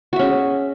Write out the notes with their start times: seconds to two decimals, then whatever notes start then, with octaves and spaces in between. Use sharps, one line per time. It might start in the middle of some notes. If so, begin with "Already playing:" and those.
0.13 F#4
0.16 E5
0.19 C#4
0.23 G#4